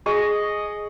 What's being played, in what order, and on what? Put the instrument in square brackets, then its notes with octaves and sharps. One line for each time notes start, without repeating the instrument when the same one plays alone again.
[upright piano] G#4 C#6 [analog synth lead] D#5